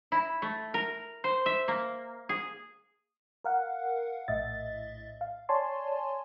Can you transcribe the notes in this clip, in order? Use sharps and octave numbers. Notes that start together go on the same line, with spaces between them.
E4
A3
A#4
C5
E5
A#3
G#4
A#4 F5 F#5
A#1 A2 D#5 E5 A6
F5
C#5 D5 G#5 A5 C6